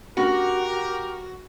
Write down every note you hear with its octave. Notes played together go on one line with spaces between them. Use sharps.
A3 C#4 D4 F#4 G4 A#4